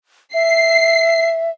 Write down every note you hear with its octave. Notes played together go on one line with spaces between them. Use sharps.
E5 C7